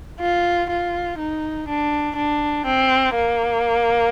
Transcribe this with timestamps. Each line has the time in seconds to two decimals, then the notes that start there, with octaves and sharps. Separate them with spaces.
0.20 F4
0.70 F4
1.19 D#4
1.68 D4
2.16 D4
2.65 C4
3.15 A#3